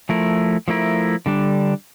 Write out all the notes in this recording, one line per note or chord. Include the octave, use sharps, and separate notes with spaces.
F3 A3 E4 A#4
F3 A3 E4 A#4
D3 G3 D4